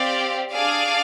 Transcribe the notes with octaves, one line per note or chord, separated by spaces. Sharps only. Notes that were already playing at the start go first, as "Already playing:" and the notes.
Already playing: C4 G4 D5 F5
D4 G#4 D5 F5